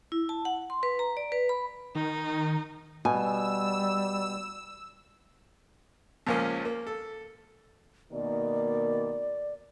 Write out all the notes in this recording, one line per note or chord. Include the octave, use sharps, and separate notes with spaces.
E4
A5
F#5
C6
B4
A#5
D5
B4
B5
D#3 D#4
B2 G3 G#5 E6
C#2 A#2 F3 A#3 C#4
A#3
A4
B2 D#3 A#3 D5